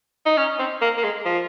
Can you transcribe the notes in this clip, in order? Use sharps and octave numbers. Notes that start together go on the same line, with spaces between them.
D#4
C#4
C4
A#3
A#3
G#3
F3